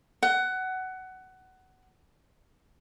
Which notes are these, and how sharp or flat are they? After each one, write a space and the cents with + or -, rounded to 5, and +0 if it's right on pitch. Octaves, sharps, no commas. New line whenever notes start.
F#5 +15